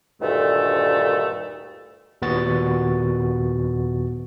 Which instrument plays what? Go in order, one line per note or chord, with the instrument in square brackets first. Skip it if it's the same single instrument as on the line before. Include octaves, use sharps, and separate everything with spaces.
[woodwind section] D2 G2 A#2 D#3 A3
[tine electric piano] D#2 A#2 B3 F#4 A6